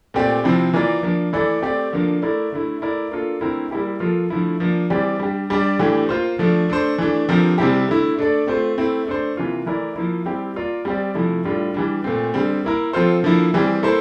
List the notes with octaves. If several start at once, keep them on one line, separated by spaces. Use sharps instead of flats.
A#2 A3 C4 G4 D5
C3 F3 C4 E4
E3 A#3 F4 A#4 D5
F3 A#3 D4
E3 A3 E4 A4 D5
A3 C4 G4 D5
D3 F3 A#3 D4
A3 E4 A#4 D5
D3 A3 E4
A3 E4 A#4 D5
A#3 D4 F4 A4
D3 A3 C4 E4 A#4
G3 A#3 E4 G4
F3 A#3 F4 A4
D3 F3 A3 E4
F3 A#3 D4
E3 G3 C4 G4 D5
G3 D4 G4
G3 D4 G4 D5
A2 E3 A3 D4 G4
A#3 F4 C5
D3 F3 A3 D4
A3 D4 A4 C5
E3 A3 D4
D3 F3 C4 G4 A#4
C3 G3 C4 E4 G4
D3 A3 E4
A3 D4 A4 D5
A3 C4 F4 C5
A3 C4 E4
A3 D4 A4 C5
C3 E3 A#3 F4
E3 A3 E4 A#4 D5
F3 A#3 E4
G3 C4 E4 G4
A#3 F4 A#4 D5
G3 C4 G4 D5
C3 F3 A3 E4
A2 G3 D4 F4
E3 G3 D4
A#2 A3 C4
D3 G3 C4
A#3 E4 A#4
F3 C4 F4 A4 C5
D3 F3 A#3 E4
E3 G3 C4
A#3 E4 A4 C5